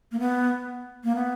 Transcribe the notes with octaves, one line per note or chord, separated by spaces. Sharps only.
A#3
B3
A#3
B3